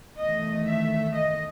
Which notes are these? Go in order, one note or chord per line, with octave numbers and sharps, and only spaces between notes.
E2 D#3 A3 D#5
E5
D#5